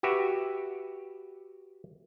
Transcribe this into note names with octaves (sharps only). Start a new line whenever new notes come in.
F#4 G4 B4 E5